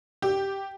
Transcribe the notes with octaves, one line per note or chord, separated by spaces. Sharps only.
G4